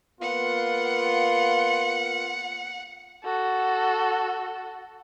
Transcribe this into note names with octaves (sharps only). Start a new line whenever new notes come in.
A#3 B3 F4 F#5
F#4 A4